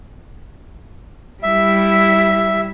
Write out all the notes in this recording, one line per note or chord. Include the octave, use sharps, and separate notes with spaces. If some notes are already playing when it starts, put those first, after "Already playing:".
G3 E4 E5